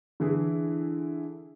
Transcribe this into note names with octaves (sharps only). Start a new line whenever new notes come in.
D3 E3 E4 G#4